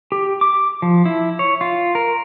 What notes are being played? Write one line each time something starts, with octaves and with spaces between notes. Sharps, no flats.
G4
D6
F3
E4
C#5
F4
A#4